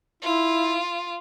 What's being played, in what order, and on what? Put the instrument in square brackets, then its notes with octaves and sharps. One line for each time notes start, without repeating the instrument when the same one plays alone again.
[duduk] E4 [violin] F4